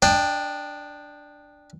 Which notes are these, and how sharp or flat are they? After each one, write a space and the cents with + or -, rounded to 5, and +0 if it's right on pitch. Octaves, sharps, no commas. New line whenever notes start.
D4 +0 D#5 -35 G5 +15